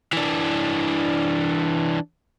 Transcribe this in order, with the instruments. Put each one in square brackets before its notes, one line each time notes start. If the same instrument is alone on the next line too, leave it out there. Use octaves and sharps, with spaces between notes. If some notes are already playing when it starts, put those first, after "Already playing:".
[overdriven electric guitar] E3 D4